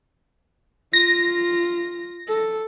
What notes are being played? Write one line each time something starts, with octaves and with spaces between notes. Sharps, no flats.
F4 A#6
A4